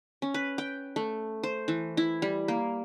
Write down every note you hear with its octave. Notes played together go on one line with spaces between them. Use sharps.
C#4
B4
G5
A3
C5
E3
E4
G3
A#3